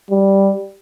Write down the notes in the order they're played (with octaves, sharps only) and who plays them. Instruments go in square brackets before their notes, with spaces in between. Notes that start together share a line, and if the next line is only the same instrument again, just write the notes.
[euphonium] G3